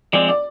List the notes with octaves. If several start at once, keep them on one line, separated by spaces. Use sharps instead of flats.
F3 G#3 C4 D5
D5